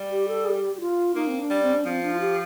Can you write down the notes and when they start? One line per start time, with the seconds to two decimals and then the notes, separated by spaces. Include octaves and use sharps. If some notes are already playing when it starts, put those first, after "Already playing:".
Already playing: G3
0.10 G4
0.28 A4
0.46 G4
0.76 G4
0.81 F4
1.15 A#3 D#4
1.28 C4
1.39 D4
1.50 G3
1.63 C4
1.74 D4
1.85 F3 C4
2.03 D4
2.14 F4
2.20 G4